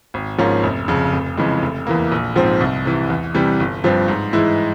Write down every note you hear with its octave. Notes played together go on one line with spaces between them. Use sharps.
G#1
G#2 F3 A#3 C#4
F1
F2 C#3
F1
F2 C#3 E3 G#3
F1
E2 E3 A#3
A#1
G#2 F3 C4
C2
C3 E3
E2
C3 E3 G3
G1
G2 F3 C4
G#2
E3 G#3 E4